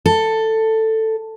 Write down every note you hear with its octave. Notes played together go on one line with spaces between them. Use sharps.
A4